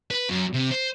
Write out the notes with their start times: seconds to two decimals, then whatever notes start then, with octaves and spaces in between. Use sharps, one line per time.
0.11 B4
0.29 F#2
0.54 C3
0.71 C5